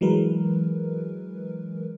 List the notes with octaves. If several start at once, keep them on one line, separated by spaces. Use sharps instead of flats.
E3 F#3 G#3 A#4 B4